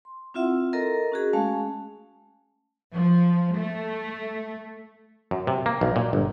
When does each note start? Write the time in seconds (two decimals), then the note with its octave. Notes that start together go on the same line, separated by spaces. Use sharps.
0.05 C6
0.34 C4 E4 F4 E5 F#5 E6
0.73 A4 A#4 D#5 A#5
1.12 C#4 F#4 G#4
1.33 G#3 A3 C#4 F5 A5
2.96 F3
3.58 A3
5.31 F#2
5.47 C3
5.66 A#3
5.81 B1
5.96 A#2
6.13 G1